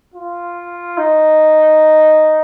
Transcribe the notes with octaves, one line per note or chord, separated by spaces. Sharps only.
F4
D#4